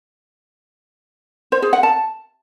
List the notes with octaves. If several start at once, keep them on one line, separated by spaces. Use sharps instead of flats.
C5
G#4
F#5
A5